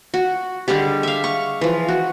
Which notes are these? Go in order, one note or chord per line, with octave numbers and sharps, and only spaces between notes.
F#4
D3 G3 G#3 G4
E5 F5
C#6
E3 F3
F#4